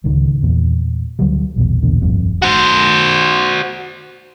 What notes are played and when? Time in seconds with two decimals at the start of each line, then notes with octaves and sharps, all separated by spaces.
0.04 D1 C#2 D#3
0.43 E2 A#2
1.19 D2 D3 F#3 G3
1.56 A#1 E2 B2
1.82 B1 E2 A#2 D3
2.01 D1 G1 F2 G3
2.42 F#4 C5